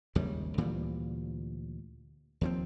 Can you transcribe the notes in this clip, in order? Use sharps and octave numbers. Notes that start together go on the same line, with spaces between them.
G#1 D#2 C#3 G3
D2 A#2 E3 G3
D#2 F3 C4